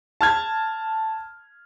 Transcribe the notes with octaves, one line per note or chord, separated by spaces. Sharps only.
A5 F6 G#6